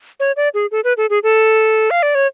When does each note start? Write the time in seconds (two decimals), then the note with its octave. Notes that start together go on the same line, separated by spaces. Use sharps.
0.20 C#5
0.37 D5
0.54 G#4
0.71 A4
0.84 B4
0.97 A4
1.10 G#4
1.23 A4
1.91 F5
2.03 D5
2.15 C#5